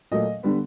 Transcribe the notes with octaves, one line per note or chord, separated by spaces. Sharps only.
A#2 F#3 A3 D#5
D3 G3 B3